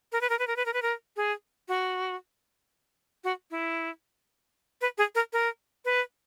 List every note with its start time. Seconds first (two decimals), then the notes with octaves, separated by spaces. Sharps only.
0.12 A#4
0.21 B4
0.30 A#4
0.39 B4
0.47 A#4
0.56 B4
0.66 A#4
0.73 B4
0.82 A#4
1.16 G#4
1.68 F#4
3.24 F#4
3.51 E4
4.81 B4
4.98 G#4
5.15 A#4
5.33 A#4
5.85 B4